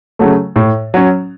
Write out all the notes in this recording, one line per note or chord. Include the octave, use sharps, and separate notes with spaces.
C#3 F#3 A3
A2
F#3 C#4